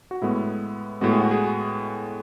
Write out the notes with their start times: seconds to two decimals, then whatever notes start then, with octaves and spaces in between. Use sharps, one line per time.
0.11 F#4
0.22 A2 G#3 B3 E4
1.01 A2 G#3 B3 F#4
1.12 G#4
1.21 F#4
1.31 G#4